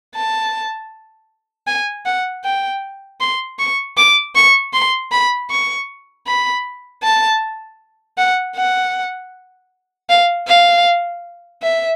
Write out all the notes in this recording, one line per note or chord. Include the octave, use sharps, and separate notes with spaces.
A5
G#5
F#5
G5
C6
C#6
D6
C#6
C6
B5
C#6
B5
A5
F#5
F#5
F5
F5
E5